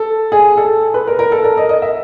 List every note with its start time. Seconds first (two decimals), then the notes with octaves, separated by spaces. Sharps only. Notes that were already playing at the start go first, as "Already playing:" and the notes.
Already playing: A4
0.32 G#4
0.57 A4
0.94 B4
1.07 A#4
1.19 A#4
1.32 A4
1.44 A#4
1.57 D#5
1.69 D#5
1.82 E5